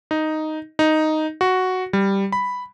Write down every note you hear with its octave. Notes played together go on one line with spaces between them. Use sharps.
D#4
D#4
F#4
G3
B5